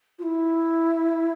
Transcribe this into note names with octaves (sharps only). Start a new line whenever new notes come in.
F4
E4